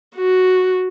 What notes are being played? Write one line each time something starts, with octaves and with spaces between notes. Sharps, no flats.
F#4